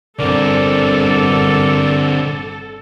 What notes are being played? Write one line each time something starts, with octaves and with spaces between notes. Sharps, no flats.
G1 D3 C4 A4 A#4 D5